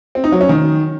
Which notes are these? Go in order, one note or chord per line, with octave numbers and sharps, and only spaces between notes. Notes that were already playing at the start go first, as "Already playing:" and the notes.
C4
D#4
F#3
C#4
D#3